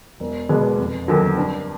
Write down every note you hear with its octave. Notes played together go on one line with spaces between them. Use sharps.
E1
E2 B2 G#3 B3
F1
D#2 D3 F#3
G2